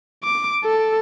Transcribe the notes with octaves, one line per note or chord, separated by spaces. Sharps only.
D6
A4